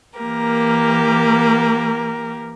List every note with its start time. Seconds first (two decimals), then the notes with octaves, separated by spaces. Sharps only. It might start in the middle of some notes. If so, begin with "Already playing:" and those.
0.19 E3 A#3 G4 A#4